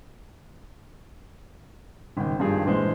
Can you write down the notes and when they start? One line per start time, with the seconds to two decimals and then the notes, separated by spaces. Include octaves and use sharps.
2.17 G#1 C#2 G5
2.39 G#1 G2 F3 G3 G#4
2.65 A#1 E3 G#3 C5